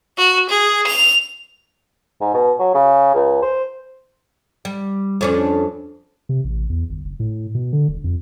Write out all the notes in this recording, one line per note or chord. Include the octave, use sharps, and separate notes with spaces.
F#4
G#4
F7
G#2
B2
F#3
C#3
C#2
C5
G3
F2 C#4 D4
C3
A1
E2
G1
F#1
A2
B2
D3
E1
F2